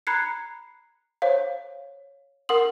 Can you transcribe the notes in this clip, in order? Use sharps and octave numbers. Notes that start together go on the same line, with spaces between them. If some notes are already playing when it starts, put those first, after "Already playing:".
A#5 B5 F#6 G#6 C7 C#7
C5 C#5 F5
A#4 F#5 C6 D#6 F#7